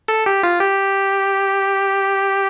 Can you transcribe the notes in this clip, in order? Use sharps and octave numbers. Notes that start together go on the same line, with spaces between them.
A4
G4
F4
G4